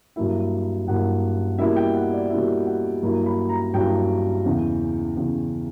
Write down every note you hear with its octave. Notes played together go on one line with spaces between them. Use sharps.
G2 F#3 A#3 E4 E5
G2 F#3 A#3 E4 F#5
B2 G3 A#3 E4 E5
G5
F#5
D5
B2 G3 A#3 E4 E5
F#5
G2 F#3 A#3 E4
B5
A#5
G2 F#3 A#3 E4 G5
E2 C#3 E3
E2 C#3 E3